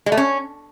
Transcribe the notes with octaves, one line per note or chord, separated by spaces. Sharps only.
G#3
A3
C#4